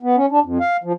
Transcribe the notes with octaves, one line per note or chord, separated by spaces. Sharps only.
B3
C#4
D4
F2
F5
F3